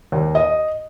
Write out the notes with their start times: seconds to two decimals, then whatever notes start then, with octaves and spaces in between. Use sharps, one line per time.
0.12 D#2
0.35 D#5